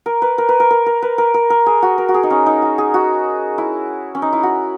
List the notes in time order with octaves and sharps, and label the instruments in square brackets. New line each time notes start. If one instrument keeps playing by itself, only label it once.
[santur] A#4
B4
A#4
B4
A#4
A#4
A#4
B4
A#4
A#4
A#4
G#4
F#4
A#4
F#4
G#4
D#4
C#4
D#4
F#4
G#4
F#4
E4
C#4
D#4
E4
F#4